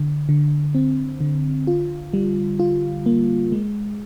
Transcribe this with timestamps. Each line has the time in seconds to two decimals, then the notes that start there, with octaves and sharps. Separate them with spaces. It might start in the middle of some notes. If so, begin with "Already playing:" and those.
Already playing: D3
0.29 D3
0.75 C4
1.21 D3
1.67 F4
2.14 G3
2.60 F4
3.06 A#3
3.52 G#3